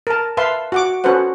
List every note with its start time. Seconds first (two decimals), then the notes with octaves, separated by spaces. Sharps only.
0.07 A#4 A5
0.37 B4 E5 F5 A5 C6
0.72 F#4 F#5 D6
1.04 C#4 F#4 A4 B4 C5 F#5